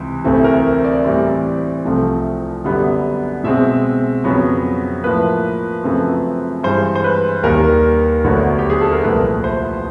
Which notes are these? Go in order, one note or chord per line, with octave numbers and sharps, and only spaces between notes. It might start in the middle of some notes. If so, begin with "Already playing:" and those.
Already playing: C#2 C3 E3
D2 C3 E3 A3 C4
A#4
D5
A2 E3 G3 C4
C2 C3 F3 A3 C4
F#2 D3 G3 B3
B2 G#3 C4 E5
F2 C#3 F#3 B3
A2 F3 A#3 B4
F#2 C#3 F3 A3 C4
G2 E3 G#3 C5
C5
B4
D#2 D#3 G3 A#3 A#4
D2 D3 F#3 B3
G4
G#4
A4
A#4
C2 A#2 F3 A3 B4
C5